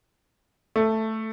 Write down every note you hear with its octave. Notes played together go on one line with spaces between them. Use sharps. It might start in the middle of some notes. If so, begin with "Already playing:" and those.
A3